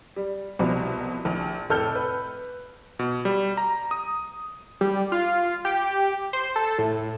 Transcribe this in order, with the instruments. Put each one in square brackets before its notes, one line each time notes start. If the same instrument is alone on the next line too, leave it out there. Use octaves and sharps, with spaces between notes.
[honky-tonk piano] G3
C2 B2 F3 G3
A#1
F1 A2 A4 E6 F6 G6
B4
[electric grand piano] B2
G3
A#5
D#6
[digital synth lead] G3
F4
G4
C5
A4
A2